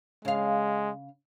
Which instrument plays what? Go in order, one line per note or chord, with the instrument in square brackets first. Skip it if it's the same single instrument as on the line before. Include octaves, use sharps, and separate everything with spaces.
[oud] C#3 F5 [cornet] G#3